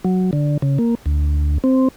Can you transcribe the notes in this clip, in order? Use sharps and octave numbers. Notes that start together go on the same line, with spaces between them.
F#3
D3
C#3
A#3
D2
C4